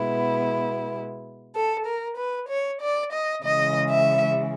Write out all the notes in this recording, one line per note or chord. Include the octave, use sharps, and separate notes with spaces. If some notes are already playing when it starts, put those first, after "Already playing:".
Already playing: B2 G#3 B3 E4
A4
A#4
B4
C#5
D5
D#5
C#3 E3 G#3 D#5
E5